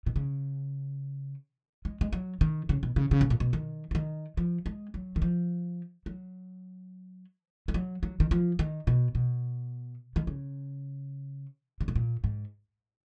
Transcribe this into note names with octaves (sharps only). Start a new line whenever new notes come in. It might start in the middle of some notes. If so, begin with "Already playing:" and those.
B2
C#3
G#3
G#3
F#3
D#3
C#3
B2
C#3
C#3
B2
A#2
B2
D#3
F3
D#3
F3
G#3
F#3
D#3
F3
F#3
G#3
F#3
F#3
D#3
F3
D#3
B2
B2
D#3
C#3
C#3
B2
A#2
G#2